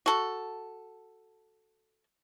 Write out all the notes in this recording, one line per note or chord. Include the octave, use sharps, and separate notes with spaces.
F#4 A4